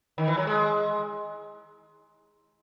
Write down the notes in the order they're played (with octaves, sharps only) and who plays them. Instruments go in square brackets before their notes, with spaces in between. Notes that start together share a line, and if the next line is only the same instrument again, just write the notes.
[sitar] D#3
E3
F#3
G#3